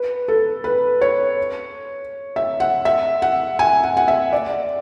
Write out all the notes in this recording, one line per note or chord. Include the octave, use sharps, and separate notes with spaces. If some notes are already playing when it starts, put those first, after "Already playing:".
Already playing: B4
A4
B4
C#5
E5
F#5
E5
F#5
G#5
F#5
F#5
E5
D5